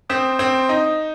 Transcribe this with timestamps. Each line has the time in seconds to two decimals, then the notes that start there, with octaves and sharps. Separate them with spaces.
0.10 C4 D#6 G6 B6 E7
0.39 C4
0.69 D#4